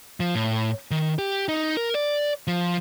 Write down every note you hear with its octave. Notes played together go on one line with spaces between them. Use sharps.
F3
A2
D#3
G4
D#4
A#4
D5
F3